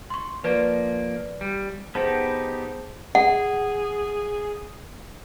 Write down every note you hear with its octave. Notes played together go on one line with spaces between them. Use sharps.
C6 C#6
F3 A#3 B4 D5
G3
B3 D#4 G4 G#4 C5 A5
G#4 F#5